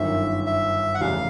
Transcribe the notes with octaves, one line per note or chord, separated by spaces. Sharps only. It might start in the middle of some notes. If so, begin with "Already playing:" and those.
Already playing: G1 F#2 D#3 E5
E5
F#5
F1 E2 C#3 F5